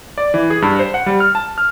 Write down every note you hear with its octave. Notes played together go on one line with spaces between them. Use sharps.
D5
E3
G#4
G2
C5
F#5
G3
F6
A5
F6